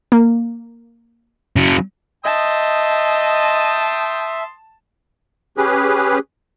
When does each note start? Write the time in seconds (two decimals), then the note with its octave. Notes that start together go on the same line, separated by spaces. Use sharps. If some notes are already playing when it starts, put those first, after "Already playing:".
0.12 A#3
1.56 C#3 F#3
2.25 D#5 E5 G5 A5 C6 D#6
5.57 C#4 G4 G#4 B4